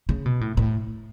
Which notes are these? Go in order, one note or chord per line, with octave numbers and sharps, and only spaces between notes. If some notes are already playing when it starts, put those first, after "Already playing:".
C#3
B2
A2
A2